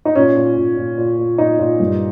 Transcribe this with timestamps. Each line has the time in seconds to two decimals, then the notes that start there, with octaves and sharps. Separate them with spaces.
0.05 D#4
0.15 A#2 C#4
0.36 A#2
0.57 A#2
0.77 A#2
0.98 A#2
1.18 A#2
1.38 A#2 D#4
1.59 A#2
1.80 G2